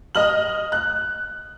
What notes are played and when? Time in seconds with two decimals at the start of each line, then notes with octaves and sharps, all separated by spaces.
0.15 D#5 F6 F#7
0.72 F#6